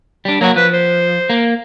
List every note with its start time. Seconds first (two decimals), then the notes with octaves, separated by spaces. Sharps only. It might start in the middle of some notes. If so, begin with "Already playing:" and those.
0.25 G3 D4
0.41 F#3 A#3 F#4
0.56 F3 B4
0.73 C5
1.30 A#3